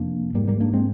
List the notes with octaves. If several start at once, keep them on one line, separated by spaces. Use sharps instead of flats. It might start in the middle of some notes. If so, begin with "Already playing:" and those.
Already playing: F2 C3 A#3 D4
G#2 G3 A#3
G3 A#3
A#3 D4
G#3 C4